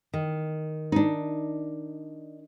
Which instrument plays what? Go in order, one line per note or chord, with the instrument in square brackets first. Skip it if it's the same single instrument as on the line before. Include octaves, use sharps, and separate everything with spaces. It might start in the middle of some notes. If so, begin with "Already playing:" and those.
[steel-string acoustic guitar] D#3
[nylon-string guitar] D4 D#4